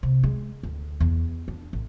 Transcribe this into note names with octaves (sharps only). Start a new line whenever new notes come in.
C3
G#3
D2
E2
D4
A1